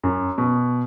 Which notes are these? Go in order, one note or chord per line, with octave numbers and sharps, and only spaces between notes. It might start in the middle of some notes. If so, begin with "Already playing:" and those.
F#2
B2